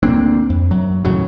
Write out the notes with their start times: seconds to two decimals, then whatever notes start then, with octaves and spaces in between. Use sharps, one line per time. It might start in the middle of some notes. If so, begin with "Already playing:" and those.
0.03 D2 A#3 C4 D4
0.50 F2
0.71 F#2 F#3
1.05 D#2 A2 C#3 F#3